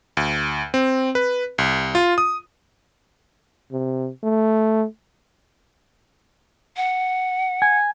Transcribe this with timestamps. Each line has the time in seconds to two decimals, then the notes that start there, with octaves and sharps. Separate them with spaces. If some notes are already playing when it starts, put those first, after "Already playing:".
0.17 D2
0.74 C4
1.15 B4
1.58 C2
1.95 F4
2.18 D#6
3.72 C3
4.24 A3
6.77 F#5
7.62 G#5